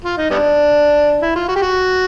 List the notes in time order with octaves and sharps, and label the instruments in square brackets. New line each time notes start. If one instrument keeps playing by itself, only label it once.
[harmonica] F4
D#4
G3 B3 D4
E4
F4
F#4
G4
F#4